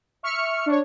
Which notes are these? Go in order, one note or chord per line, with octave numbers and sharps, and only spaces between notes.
E5 C#6 F6 C#7
D4 C#5